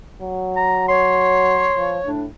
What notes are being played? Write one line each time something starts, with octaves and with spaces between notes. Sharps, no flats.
F#3
A#5
C#5 C6
F3
A2 D4